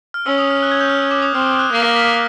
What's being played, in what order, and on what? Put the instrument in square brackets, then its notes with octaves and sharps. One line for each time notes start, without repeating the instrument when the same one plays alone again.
[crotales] F6
[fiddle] C#4 [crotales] E6
[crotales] D#6
F6
F#6
G#6
G6
F6
E6
D6
D#6
[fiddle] C4 [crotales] F6
[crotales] F6
F#6
[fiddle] A#3 [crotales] G6
[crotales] A#6
B6